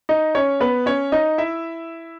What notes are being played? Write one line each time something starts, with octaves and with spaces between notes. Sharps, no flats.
D#4 D#5
C#4 C#5
B3 B4
C#4 C#5
D#4 D#5
E4 E5